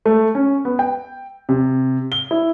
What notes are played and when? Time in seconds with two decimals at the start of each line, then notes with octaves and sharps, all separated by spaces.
0.06 A3
0.35 C#4
0.65 B3
0.79 G5
1.49 C3
2.12 G7
2.31 E4